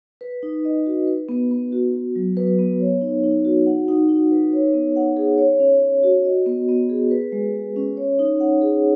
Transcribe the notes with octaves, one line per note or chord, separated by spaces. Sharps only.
B4
D#4
D#5
F#4
B4
B3
B3
F#4
F#4
F#3
B4
B3
C#5
D#4
D#4
F#4
F#5
D#4
D#4
B4
C#5
B3
F#5
G#4
C#5
C#4
C#4
F#4
D#5
B3
B3
G#4
B4
G#3
G#3
C#4
C#5
D#4
F#5
G#4